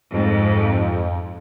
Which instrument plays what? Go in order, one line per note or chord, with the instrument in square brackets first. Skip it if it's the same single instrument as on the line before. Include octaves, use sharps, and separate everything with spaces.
[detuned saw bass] F2 [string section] G#2